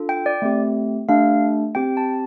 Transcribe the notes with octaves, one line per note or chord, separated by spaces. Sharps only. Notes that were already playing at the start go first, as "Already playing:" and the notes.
Already playing: D4 F4 A4
G5
D5
A3 C4 G4
A3 D4 G4 F5
C4 G4 G5
A5